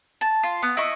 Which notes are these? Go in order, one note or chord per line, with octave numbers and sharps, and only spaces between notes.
A5
F4
B3
E4 D#5 E5 C#6